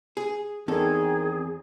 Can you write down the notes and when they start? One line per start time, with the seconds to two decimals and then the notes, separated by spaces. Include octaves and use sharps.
0.17 G#4
0.68 E2 D#3 C4 G#4 A4